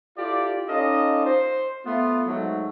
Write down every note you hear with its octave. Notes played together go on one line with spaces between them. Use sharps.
E4 F4 G4 A4 D5
C#4 D#4 F4 A4 D5 D#5
C5
A3 B3 F4
G#2 F#3 A3